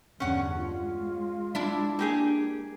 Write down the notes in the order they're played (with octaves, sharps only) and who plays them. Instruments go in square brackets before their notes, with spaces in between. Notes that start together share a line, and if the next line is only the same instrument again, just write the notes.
[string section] E2 G2 D3 [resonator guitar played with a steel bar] C#4 F#5
[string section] G#3 [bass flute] F4
[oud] D4 E4
[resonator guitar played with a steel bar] A#3 G4 G#4